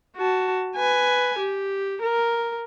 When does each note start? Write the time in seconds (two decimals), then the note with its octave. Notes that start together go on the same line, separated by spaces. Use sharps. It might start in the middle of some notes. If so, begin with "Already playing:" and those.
0.16 F#4 A5
0.76 B4 G#5
1.39 G4
2.02 A#4